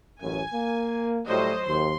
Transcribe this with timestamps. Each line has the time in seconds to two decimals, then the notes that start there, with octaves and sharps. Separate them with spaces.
0.22 A1 F#2 G#5
0.53 A#3
1.28 A2 F#3 G3 C5 D#5
1.66 D#2 C6